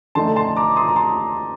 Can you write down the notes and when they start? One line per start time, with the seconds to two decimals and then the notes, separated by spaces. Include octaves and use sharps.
0.15 D3 A3 D#4 A5 C6
0.36 A5 C6
0.57 A#5 D6
0.76 C6 D#6
0.88 A#5
0.96 A5 C6